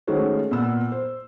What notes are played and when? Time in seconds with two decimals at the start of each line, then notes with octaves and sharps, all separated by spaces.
0.07 D#3 G#3 A3 C#4 F#4 C5
0.51 A#2 B3 E6
0.92 C5